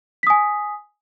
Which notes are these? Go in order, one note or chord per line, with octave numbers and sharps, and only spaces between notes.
G#5 D#6 B6